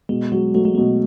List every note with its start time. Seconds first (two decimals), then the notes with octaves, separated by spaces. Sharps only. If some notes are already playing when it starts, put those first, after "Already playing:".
0.09 B2 G#3
0.32 F#3 G#3
0.54 F#3 A3
0.65 G#3
0.75 B2 A3